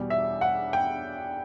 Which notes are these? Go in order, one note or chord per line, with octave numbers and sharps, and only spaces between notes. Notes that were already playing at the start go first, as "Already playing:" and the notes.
Already playing: E2 B2 G3
E5
F#5
G5